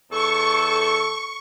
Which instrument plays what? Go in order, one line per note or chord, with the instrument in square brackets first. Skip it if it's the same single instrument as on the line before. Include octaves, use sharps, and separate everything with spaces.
[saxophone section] E2 A4 [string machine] C#6